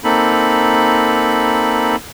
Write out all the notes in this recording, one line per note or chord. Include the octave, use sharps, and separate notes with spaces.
A#3 C4 D#4 A4 B5